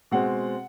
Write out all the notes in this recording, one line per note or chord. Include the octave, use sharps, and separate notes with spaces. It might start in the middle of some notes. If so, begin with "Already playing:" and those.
B2 G#3 C4 F#5